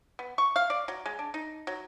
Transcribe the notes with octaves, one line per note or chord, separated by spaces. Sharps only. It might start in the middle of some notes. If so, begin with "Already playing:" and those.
B3
C#6
F5
D5
F#3
G#3
D4
D#4
F#3